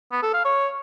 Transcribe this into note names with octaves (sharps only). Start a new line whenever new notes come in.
B3
A4
F5
C#5